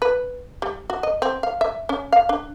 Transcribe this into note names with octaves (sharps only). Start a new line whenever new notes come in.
B4
G3
F#4
D#5
C4
F5
E5
C#4
F5
D4